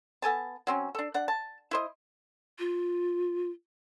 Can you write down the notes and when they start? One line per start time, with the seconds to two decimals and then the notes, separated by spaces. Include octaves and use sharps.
0.22 B3 A4 G#5 A5
0.67 F#3 C4 C#4
0.95 D4 A4
1.14 D4 F#5
1.28 A5
1.71 E4 C5 D#5
2.59 F4